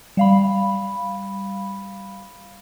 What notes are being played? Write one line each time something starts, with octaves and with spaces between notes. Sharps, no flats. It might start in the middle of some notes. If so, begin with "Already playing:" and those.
G3 F5 B5